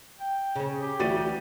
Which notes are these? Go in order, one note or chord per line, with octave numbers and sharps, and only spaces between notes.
G5
C#3 C#4
G4
D2 E3 G3 F#4 A6 D#7